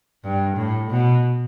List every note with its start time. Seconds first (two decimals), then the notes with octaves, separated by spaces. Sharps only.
0.23 G2
0.56 A2
0.90 B2